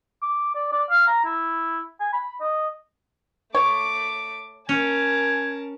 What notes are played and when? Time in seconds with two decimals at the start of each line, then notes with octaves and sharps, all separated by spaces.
0.22 D6
0.55 D5
0.72 D5
0.90 F5
1.08 A#5
1.25 E4
2.00 G#5
2.13 B5
2.41 D#5
3.55 A3 C#5 D6
4.69 C#4 A#4 G#5 A5